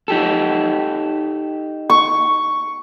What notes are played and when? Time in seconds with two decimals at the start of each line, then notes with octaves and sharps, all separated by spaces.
0.08 D#4 G4 A4
1.90 C#6